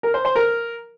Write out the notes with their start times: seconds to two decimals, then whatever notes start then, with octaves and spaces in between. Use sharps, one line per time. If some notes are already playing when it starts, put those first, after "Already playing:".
0.03 A#4
0.14 C5
0.25 C5
0.36 A#4